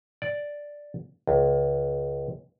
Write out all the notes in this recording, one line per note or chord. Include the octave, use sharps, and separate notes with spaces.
D5
C#2